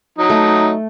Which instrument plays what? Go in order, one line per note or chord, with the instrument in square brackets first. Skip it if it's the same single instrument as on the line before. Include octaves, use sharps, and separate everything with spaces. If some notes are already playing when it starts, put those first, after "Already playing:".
[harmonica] F#3 D#4 D#5
[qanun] A3